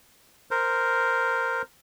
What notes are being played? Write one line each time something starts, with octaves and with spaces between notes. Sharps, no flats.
A#4 C5